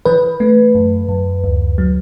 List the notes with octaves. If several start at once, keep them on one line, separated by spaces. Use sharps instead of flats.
E3 B4
A3
F#2
F#2
D2
F#3